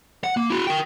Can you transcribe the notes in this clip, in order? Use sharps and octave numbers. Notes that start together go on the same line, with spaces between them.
F#5
A#3
E4 F#4
A#4 G5